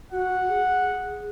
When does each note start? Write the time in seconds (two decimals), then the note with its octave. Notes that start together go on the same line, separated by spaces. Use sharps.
0.12 F#4 F#5
0.49 G#4